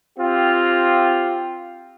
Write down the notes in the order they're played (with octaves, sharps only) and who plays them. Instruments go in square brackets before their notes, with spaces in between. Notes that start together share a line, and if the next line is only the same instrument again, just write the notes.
[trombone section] C4 F4 G4